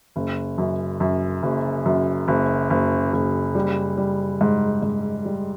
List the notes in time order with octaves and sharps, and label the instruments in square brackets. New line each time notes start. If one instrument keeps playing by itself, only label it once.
[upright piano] F#1
F#2
F#2
F#1
F#2
F#1
F#1
F#1
G3
G3
G#2
G#2
G3